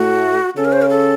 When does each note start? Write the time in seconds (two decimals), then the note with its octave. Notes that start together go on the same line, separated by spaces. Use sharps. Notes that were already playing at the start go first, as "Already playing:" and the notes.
Already playing: A2 A3 F#4
0.56 C#3 C#4 A4
0.65 A#4
0.72 C5
0.82 A#4
0.89 A4